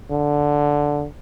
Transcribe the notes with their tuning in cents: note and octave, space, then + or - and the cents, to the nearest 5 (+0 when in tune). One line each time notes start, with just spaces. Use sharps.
D3 -5